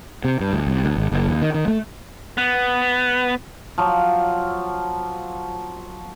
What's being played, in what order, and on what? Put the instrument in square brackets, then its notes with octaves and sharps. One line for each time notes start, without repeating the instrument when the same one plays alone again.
[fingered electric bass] C3
G2
D2
C2
D2
G#1
F#1
D#2
D#3
D#3
A3
[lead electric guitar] B3
[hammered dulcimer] F3 F#3